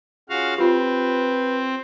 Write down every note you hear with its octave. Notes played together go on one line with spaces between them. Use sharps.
C#4 F4 F#4 G#4 F5
C4 F4 G4 B4